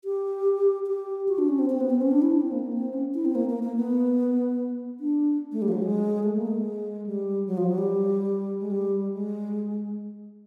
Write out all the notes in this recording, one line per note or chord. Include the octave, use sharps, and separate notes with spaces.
G4
G4
F#4
D4
C#4
C4
C4
B3
C4
C#4
D4
E4
D4
C4
A#3
C4
C#4
E4
C4
A#3
A#3
A#3
B3
D4
A3
G3
F3
F#3
G#3
A3
A#3
A3
G#3
G3
F#3
F3
F#3
G3
G#3
G3
G#3